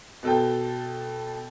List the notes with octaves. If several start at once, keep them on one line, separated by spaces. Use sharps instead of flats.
B2 A4 G5